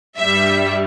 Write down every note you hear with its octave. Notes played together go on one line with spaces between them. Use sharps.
G2 G3 E5